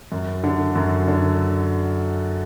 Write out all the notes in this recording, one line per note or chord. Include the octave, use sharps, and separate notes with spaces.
F#2
D3
F#2
D3